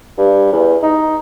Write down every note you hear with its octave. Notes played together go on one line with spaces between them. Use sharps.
G2
E2
D#4